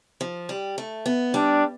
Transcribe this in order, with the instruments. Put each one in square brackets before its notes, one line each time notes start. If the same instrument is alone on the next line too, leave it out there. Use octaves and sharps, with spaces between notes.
[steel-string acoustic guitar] F3
G3
A3
B3
[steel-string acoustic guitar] G3 [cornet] D4